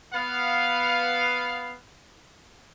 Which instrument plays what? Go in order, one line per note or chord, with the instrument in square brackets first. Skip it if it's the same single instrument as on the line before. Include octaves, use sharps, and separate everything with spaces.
[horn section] B3 F5